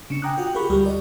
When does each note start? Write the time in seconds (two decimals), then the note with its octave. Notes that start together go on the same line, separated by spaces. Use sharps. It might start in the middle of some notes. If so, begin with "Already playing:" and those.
0.10 C#3 D4 C#7
0.22 G5 G#5 A#5 D6 D#6 F#6
0.38 F4 F#4 F#5 G5
0.54 F4 G4 G#4 A#4 B5 C#6
0.70 D2 G3 G4
0.85 A#4 D5 D#5